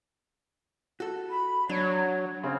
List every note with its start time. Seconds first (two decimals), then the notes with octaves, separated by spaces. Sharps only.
1.00 F#4 A4
1.30 B5
1.69 F#3 D4 C#5
2.43 C#3 C4 C5 C#5